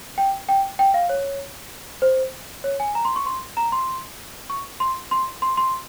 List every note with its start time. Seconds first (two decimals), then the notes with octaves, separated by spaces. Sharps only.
0.18 G5
0.49 G5
0.79 G5
0.94 F5
1.09 C#5
2.02 C5
2.64 C#5
2.80 G#5
2.95 A#5
3.05 C6
3.16 C#6
3.26 C6
3.57 A#5
3.72 C6
4.50 C#6
4.80 C6
5.11 C6
5.42 C6
5.57 C6